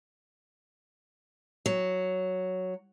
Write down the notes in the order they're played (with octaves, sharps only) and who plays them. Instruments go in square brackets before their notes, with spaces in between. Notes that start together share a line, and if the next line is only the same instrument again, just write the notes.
[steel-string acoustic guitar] F#3